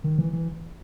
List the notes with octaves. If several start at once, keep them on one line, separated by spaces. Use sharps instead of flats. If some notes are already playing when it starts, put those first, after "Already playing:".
D#3
E3
E3